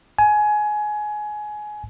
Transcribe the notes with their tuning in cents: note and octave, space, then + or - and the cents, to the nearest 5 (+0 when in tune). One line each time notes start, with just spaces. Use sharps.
G#5 +20